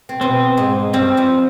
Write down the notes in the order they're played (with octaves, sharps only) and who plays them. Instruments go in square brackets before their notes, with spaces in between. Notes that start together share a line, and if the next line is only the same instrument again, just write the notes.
[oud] C4
[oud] B2 B3 [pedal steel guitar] C4
[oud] G#2 G#3
[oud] G2 G3 [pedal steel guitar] C4
[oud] F2 F3